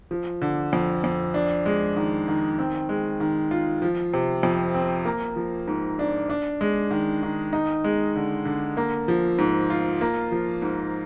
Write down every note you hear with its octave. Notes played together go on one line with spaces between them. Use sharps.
F3
D3
F2
F2
D4
G#3
D#3
D#3
C4
G#3
D#3
F4
F3
C3
F2
C4
A#3
F3
G#2
D4
D4
G#3
D#3
D#3
D#4
G#3
D3
D3
A#3
F3
G#2
F4
A#3
F3
G#2